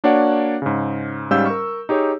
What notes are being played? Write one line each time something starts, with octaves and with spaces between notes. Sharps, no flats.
A#3 D4 F#4 C#5 D5 F#5
G#2 C#3
G#2 G3 C#4 F5 E6 G6
A#4 C#6
D#4 G4 G#4 C#5